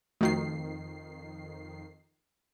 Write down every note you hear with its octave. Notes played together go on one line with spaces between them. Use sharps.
F2 D#3 A3 F#4 C7